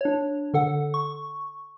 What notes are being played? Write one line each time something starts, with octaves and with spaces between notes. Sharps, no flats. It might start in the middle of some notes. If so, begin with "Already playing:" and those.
D4 C#5
D3 A4 F#5
C#6